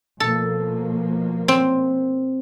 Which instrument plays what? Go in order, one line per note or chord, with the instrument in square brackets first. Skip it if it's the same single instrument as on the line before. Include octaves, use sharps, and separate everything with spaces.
[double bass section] B2 F3 A#3 [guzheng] A4
[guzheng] C4